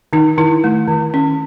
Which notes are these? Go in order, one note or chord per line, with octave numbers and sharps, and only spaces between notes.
D#3 D#4
D#3 E4
A3
D#3
C#4